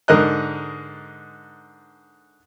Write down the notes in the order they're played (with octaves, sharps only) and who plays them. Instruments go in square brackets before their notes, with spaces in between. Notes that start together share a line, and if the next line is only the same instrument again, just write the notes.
[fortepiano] G#2 D3 A#4 D#5 F#6